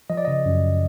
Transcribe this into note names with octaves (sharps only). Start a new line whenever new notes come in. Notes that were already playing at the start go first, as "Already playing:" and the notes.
F3 D#5
D5
C#3 D#5
F#2